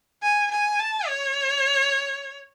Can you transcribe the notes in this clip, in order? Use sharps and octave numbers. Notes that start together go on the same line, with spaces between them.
G#5
G#5
A5
C#5